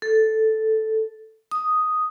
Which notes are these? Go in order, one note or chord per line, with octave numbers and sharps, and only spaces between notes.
A4
D#6